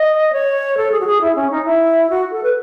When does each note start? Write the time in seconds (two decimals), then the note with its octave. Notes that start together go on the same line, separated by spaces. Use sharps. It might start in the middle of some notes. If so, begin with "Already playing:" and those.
Already playing: D#5
0.33 C#5
0.77 A4
0.92 G#4
1.00 F#4
1.06 G#4
1.21 E4
1.35 C#4
1.51 D#4
1.65 E4
2.10 F#4
2.32 A4
2.43 B4